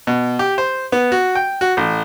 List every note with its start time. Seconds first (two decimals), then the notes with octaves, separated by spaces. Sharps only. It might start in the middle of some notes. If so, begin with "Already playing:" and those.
0.07 B2
0.39 G4
0.58 C5
0.92 B3
1.12 F#4
1.35 G5
1.61 F#4
1.77 A1